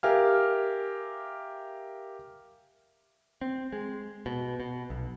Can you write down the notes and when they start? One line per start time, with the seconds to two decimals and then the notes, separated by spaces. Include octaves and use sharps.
0.03 G4 A#4 E5 F5 G#5 F6
3.41 C4
3.73 G#3
4.26 B2
4.60 B2
4.90 B1